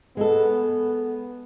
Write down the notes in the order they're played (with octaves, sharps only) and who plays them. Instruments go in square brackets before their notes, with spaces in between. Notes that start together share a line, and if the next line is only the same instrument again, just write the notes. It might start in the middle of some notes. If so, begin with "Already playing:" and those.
[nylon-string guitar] G#3 A4 [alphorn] B3